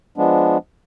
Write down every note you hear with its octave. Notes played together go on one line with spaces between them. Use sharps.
F3 G#3 B3 D4